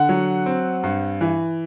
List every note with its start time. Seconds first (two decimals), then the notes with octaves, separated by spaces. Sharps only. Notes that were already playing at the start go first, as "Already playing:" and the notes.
Already playing: D3 F#5
0.09 F#3
0.46 C4
0.83 G2
1.21 E3